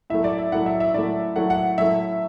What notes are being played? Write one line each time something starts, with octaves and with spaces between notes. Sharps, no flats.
A2 F#3 A3 E5
D5
E5
A2 F#3 A3 F#5
E5
E5
A2 F#3 A3 D5
A2 F#3 A3 F#5
F#5
A2 F#3 A3 E5